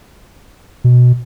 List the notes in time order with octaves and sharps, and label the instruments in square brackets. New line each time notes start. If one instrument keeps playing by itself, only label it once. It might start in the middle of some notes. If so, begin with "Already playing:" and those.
[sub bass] B2